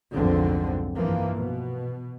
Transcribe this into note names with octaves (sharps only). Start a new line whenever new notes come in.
B1 F2 G#2 D3 F3 C4
G2 E3 F3 A#3
B2